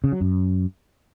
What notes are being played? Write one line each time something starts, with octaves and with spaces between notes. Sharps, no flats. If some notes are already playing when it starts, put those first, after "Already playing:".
C#3
F#3
F#2